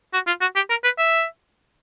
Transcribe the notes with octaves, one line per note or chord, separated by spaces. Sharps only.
F#4
F4
F#4
G4
A#4
B4
E5